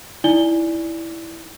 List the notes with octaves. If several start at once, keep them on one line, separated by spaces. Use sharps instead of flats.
D#4 E4 D5 G#5 G7